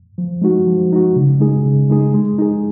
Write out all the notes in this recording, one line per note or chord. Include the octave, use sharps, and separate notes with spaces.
F3
G#3 D#4 F#4
F3
G#3 D#4 F#4
C#3
G#3 D#4 G#4
C#3
G#3 D#4 G#4
G#3
D#4 G#4